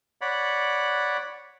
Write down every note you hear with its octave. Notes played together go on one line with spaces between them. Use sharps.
C#5 D5 F#5 B5